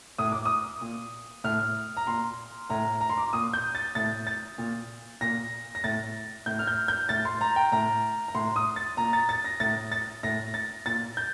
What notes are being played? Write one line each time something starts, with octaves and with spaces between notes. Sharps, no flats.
A2 D#6
D6
D#6
A#2
A2 F6
A#5
A#2 C6
A2 A#5
A#5
C6
D6
A#2 D#6
G6
A6
A2 A6
A6
A#2
A#2 A#6
A#6
A2 A6
A2 G6
F6
G6
G6
A2 A6
C6
A#5
G5
A2 A#5
A#5
A2 C6
D#6
A6
A#2 A#5
A6
A6
A#6
A2 A6
A6
A2 A#6
A6
A#2 A6
G6